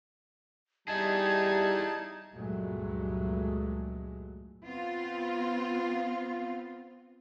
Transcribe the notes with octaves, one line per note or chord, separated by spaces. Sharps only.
G3 D#4 E4 G#4 A5 G#6
C#2 G2 A#2 F#3 G#3 A3
B3 C4 F4